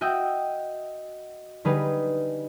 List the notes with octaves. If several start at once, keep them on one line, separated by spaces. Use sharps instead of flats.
F#4 D#5 E5 G5
D3 G3 D#4 G#4 B4